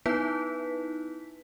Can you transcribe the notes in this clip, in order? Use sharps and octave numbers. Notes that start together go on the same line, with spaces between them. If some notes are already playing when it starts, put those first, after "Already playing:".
B3 D#4 E4 B4 B6